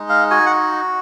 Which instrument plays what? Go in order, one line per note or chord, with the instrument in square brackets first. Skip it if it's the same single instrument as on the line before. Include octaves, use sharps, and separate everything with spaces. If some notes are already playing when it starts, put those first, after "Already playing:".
Already playing: [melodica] G#3 D#4
F5
F#4 G#5
F#5